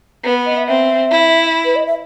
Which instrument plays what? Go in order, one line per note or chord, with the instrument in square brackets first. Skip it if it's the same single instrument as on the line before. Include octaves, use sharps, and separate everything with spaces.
[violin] B3 [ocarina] B4
[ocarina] D#5
E5
[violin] C4 [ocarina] E5
[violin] E4
[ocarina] B4
D#5
E5